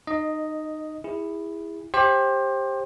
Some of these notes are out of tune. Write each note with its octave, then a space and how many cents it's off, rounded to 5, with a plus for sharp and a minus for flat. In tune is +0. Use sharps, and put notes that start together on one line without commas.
D#4 -20 D#5 +0
E4 +0 G#4 -25
G4 +5 C5 +25